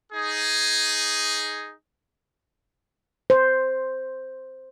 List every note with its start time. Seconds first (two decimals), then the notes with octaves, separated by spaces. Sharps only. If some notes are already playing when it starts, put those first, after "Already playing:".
0.13 D#4 G#4
3.30 C5